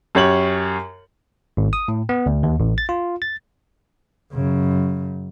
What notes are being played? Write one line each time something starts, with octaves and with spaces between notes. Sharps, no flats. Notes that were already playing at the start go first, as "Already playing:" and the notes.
F#2 G4 C#5 F#7
G#1
D#6
A2
B3
D2
D#2
A1
A6
F4
A6
F#2 C#3